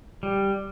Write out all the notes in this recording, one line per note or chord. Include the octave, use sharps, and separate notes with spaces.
G3